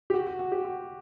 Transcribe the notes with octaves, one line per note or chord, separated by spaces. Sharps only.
G4
F#4
F#4
F#4
G4
F#4